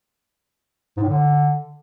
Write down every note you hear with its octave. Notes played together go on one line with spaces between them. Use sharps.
G#2
A2
D3